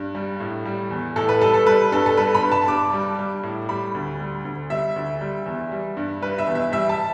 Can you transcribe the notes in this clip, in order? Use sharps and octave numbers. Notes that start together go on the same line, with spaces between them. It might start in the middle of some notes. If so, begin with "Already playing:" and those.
Already playing: G2
G3
A2
G3
E2
A2 A4
B4
G3 A4
A4
G3 B4
G2 A4
A4
G3 B4
B5
G2
A5
G2 D6
G3
G3
A2
G3 B5
D2
G3
D2
G3 E5
D2
G3
E2
G3
G2
G3 B4
E5
E2
E5
G3 E5
A5